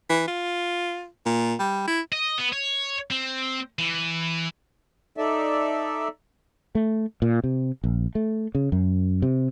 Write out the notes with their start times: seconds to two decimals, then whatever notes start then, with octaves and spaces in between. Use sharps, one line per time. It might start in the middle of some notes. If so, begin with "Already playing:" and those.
0.09 E3
0.28 F4
1.26 A#2
1.59 G3
1.87 E4
2.12 D#5
2.38 B3
2.52 C#5
3.11 C4
3.79 E3
5.17 D#4 A4 D5 E5
6.75 A3
7.22 A#2
7.44 C3
7.84 A#1
8.15 A3
8.55 C#3
8.72 F#2
9.22 C3